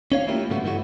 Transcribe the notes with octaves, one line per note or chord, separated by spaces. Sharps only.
C#4 C#5 F5
A3 A#3 E4 F4 G4
G#2 C#3 G3 A3 B3 F#4
G2 E3 A3 E4 F#4